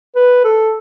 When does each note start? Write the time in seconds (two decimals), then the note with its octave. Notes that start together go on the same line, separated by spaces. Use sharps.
0.16 B4
0.44 A4